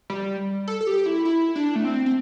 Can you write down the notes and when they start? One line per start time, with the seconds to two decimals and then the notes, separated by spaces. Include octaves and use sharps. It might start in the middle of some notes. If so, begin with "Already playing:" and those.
0.10 G3
0.68 A4
0.81 A4
0.87 G4
1.06 E4
1.25 E4
1.56 D4
1.75 A3
1.84 C4
2.06 C4